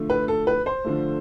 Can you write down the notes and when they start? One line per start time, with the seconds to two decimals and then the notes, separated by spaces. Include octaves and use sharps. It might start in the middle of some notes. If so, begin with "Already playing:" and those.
Already playing: D3 F3 A3
0.10 B4
0.28 A4
0.47 B4
0.66 C5
0.84 D3 F3 A3